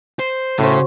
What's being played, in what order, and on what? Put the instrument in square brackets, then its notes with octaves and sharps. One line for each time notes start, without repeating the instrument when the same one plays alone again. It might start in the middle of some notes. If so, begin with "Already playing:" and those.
[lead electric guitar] C5
[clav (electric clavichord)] A2 [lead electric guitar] C#3 [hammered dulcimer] F#4 C5
[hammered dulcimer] C#5